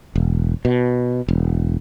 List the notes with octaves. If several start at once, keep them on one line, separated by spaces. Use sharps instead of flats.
E1
B2
E1